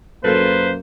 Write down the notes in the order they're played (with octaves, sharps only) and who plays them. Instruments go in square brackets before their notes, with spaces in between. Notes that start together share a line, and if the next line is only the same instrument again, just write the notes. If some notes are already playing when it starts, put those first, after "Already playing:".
[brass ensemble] F#2 A#3 [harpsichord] F4 A4 [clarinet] B4 [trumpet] C5